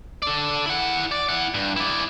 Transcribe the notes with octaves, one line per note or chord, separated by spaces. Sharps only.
A4 D5
E4 F#5
D5
E4 F#5
G2
E4 D5